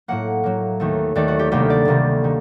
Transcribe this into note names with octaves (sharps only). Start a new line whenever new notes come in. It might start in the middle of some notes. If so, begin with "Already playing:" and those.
A2 F#3 A#3 F#5
A2 F#3 A#3
D#2 D#3 A3
D#2 D#3 A3 D5
F#4
G4
D2 C3 D#3 G3 A#3 G4
D5
D2 C3 D#3 G3 A#3
D#3 F#3